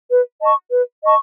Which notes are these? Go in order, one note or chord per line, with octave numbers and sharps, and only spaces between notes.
B4
D#5 A5 C#6
B4
D#5 A5 C#6